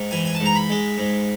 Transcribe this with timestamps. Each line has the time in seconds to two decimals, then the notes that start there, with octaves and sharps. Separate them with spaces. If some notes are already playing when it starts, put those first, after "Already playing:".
Already playing: G#2
0.11 E3 G#5
0.25 G#5
0.35 A5
0.40 G#2
0.46 A#5
0.55 B5
0.70 G#3
0.98 G#2